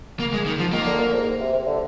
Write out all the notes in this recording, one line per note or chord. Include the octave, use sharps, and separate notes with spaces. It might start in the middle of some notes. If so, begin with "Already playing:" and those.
A#3
G#3
D#3
F3
D#3 A#3
D3
A#2
G#2
C3
C3
D3